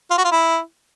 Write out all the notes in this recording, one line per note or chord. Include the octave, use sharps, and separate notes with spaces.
F4
F#4
F4
E4